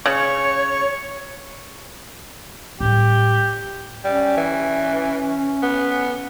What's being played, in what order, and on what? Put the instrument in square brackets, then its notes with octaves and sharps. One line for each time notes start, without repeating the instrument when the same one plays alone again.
[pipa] C#3 [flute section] C#5 [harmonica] C#6
[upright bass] A2 G3 [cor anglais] G4
[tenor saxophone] G3 [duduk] C#4
[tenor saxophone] E3
B3